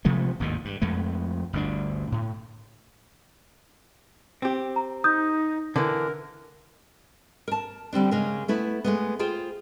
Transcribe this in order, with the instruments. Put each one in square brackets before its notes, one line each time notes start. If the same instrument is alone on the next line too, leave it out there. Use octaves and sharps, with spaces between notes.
[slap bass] C3 F3 G#3 A3
G#1 D#2 A2 D#3
G2
F2 G#3 A3
G1 D2 D3 D4
A2
[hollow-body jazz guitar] C4 G4
[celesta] A#5
[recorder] D#4 [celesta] D#6 G6
[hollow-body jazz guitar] D3 E3 [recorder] A#4
[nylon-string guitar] A#4 A5
D3 G3 C4 D4
C#3 G#3 A#4
A3 B3 E4
G#3 A3 B3
F4 G#4 C5 G5